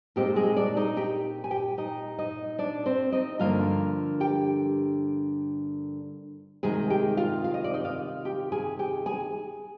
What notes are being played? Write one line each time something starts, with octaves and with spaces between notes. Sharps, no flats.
A#2 G#3 C4 D#4 G4
G#3 G#4
D4 D5
D#4 D#5
G4 G5
G#5
G4 G5
D#4 D#5
D#4 D#5
D4 D5
C4 C5
D#4 D#5
G2 D3 F3 A#3 F4 F5
G4 G5
C3 D#3 G#3 G#4 G#5
G4 G5
F4 F5
F5
D#5
D5
D#4 D#5
F4 F5
G4 G5
G#4 G#5
G4 G5
G#4 G#5